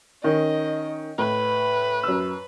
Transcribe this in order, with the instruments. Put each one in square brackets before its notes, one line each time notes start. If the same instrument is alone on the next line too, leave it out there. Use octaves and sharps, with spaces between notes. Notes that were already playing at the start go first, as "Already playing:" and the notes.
[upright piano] D#3 C#4 [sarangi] D#5
[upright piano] A2 [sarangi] B4
[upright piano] F#2 E6